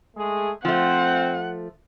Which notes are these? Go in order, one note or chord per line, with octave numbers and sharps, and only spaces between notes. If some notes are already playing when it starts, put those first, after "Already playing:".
G#3 A3 G#4
F3 A3 C4 F#5